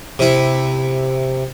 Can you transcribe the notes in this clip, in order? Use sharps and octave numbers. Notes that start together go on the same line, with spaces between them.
C3 E4